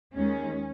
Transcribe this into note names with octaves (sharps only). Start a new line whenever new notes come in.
D#2 D#3 G#3 C#4